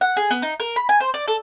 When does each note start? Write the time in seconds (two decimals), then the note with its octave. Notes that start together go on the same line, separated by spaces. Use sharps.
0.01 F#5
0.17 G#4
0.31 B3
0.42 D#4
0.60 A#4
0.76 B5
0.89 G#5
1.00 C5
1.14 D5
1.28 A4